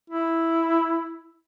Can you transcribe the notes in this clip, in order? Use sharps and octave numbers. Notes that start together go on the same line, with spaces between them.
E4